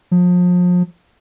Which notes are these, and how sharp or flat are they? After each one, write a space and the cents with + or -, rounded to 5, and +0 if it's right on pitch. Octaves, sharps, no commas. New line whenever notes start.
F3 +35